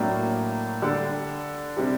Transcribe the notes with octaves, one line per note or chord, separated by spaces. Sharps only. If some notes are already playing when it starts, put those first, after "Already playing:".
Already playing: A2 F#3 A#3 D4
D3 G3 D4
C3 G3 D4